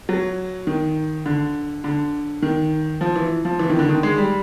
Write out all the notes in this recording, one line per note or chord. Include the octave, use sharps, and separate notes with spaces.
F#3
D#3
D3
D3
D#3
F3
E3
F3
E3
D#3
D3
D#3
G#3
G3